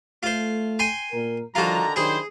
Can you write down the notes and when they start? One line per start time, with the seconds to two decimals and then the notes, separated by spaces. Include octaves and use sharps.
0.23 A3 F4 C5
0.79 G5 G#5 C6
1.12 A#2 A#4
1.55 D3 D#3 F3 G3 F4 F#4 A#5
1.96 D#3 F#3 D4 E4 G4 G#4 C5